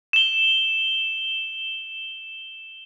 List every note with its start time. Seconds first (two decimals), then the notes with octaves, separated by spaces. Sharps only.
0.13 E7 G7